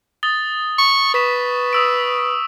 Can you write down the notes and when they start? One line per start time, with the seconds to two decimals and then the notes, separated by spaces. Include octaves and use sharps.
0.23 D#6 A6 G7
0.78 C#6
1.14 B4 C#6 B6 E7
1.73 D#6 E6 D7